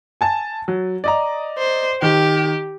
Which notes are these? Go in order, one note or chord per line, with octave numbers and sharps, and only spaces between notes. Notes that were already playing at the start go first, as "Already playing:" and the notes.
G#5 A5 A6
F#3
D5 D#5 A#5
C5
D#3 G4